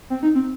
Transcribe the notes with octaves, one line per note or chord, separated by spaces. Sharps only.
C4
D#4
C4